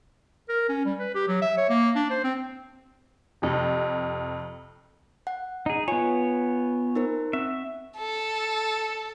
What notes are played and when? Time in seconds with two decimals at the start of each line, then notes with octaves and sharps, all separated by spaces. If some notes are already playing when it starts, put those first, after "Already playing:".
0.49 A#4
0.69 C#4
0.86 G3
0.99 B4
1.15 G4
1.28 F#3
1.42 E5
1.57 C#5
1.69 A#3
1.96 D4
2.11 C5
2.24 C4
3.42 F2 C3
5.27 F#5
5.66 D#4 G#4
5.88 B3 F4 C#5 G#5
6.95 D#4 A#4 C5
7.33 C4 E5
7.98 A4